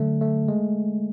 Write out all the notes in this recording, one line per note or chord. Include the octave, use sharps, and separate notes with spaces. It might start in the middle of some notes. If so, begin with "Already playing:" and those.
Already playing: D3 F#3 A3
A3
G#3